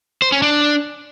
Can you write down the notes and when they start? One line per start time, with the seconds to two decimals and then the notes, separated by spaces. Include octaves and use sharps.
0.22 C5
0.32 C#4
0.42 D4